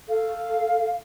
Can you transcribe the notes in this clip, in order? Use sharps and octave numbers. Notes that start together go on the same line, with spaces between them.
A4 F5